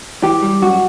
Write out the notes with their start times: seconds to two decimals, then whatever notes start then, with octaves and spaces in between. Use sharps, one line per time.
0.23 E3 G4
0.42 G3
0.62 F#2 F#4